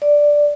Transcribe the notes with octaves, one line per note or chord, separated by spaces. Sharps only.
D5